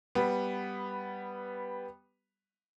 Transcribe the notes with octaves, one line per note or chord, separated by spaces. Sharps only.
G3 B3